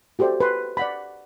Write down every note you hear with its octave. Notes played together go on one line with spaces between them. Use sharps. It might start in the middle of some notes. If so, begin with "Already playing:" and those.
F#4 G4 A4 C5 D5 E5
B4 C6
D5 F#5 B5